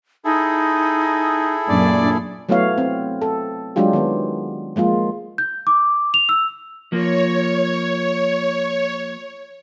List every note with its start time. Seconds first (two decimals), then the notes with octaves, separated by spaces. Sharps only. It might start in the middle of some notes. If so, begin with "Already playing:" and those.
0.25 D#4 E4 G#4 A4
1.68 F#2 A#2 D4 D5
2.49 F#3 A3 B3 E4 C#5 F5
2.78 C4
3.22 A4
3.76 F#3 G#3 D4 F4 G4
3.93 D#3 B3
4.76 F3 G#3 A#3 F4
5.38 G6
5.67 D6
6.14 F7
6.29 E6
6.92 F3 A#3 C#5